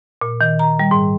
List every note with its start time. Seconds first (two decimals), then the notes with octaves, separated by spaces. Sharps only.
0.21 A#2
0.41 D#3
0.59 A#5
0.79 G3
0.91 G#2